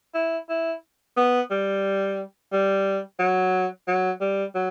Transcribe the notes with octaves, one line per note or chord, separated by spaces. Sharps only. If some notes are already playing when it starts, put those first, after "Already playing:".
E4
E4
B3
G3
G3
F#3
F#3
G3
F#3